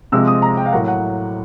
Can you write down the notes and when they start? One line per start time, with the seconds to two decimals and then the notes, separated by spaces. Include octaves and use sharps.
0.12 C3 F3 G#3 C4 E6
0.27 D#6
0.42 A#5
0.57 G5
0.66 F5
0.72 A2 F#3 A#3 F#5
0.88 F#5